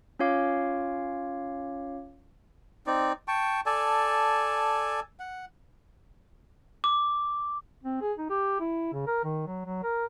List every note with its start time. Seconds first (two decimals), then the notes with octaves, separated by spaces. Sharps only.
0.19 C#4 F4 C#5 F5 D6
2.87 C4 D#4 D5
3.28 G5 A5 C#6
3.66 A4 D5 G#5 A5
5.20 F#5
6.84 D6
7.84 C4
8.01 G#4
8.18 D#4
8.30 G4
8.60 E4
8.93 C#3
9.07 A#4
9.24 D#3
9.47 F#3
9.66 F#3
9.83 A#4